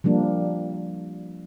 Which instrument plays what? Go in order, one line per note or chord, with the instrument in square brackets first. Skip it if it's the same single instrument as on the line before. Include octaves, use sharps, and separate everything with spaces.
[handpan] F3 G3 A#3 D4